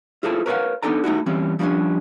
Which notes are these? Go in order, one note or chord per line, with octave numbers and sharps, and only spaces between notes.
E4 F4 G#4 A4 C5 A5
A#4 B4 C#5 D5 F5 F#5
B3 D4 D#4 A4 D5 A#5
A3 D#4 E4 F#4
E3 G3 C4 C#4
F3 G3 A#3 C#4 D4